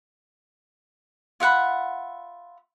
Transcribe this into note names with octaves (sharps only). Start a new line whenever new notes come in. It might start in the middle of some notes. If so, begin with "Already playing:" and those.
F4 E5 F#5 B5